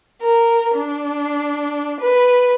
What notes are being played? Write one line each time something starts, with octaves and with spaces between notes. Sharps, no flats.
A#4
D4
B4